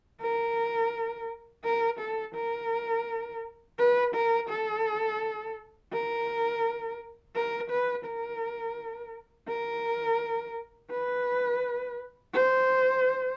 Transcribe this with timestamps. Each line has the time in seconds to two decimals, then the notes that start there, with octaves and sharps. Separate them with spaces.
0.22 A#4
1.65 A#4
2.00 A4
2.35 A#4
3.79 B4
4.15 A#4
4.49 A4
5.93 A#4
7.35 A#4
7.70 B4
8.06 A#4
9.48 A#4
10.91 B4
12.34 C5